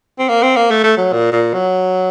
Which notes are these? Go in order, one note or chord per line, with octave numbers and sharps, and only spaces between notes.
C4
A#3
C4
A#3
A3
A3
F#3
A#2
A#2
F#3